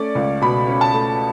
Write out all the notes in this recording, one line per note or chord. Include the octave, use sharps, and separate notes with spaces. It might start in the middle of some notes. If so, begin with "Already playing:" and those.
Already playing: A3 C#4 D5
C#2
B2 B5
C#4
A5
A3